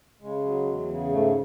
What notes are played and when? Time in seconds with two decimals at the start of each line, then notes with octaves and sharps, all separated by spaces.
0.21 C#3 G#3
0.44 F#3
0.66 E2
0.88 C#3
1.11 G#2 A3